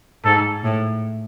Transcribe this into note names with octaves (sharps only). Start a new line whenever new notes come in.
G#2 A4
A2